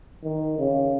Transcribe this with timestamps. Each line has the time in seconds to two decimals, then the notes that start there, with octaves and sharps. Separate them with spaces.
0.24 D#3
0.59 C#3